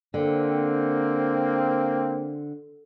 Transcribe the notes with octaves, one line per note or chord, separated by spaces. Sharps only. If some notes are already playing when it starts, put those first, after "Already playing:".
D3 A#3 C4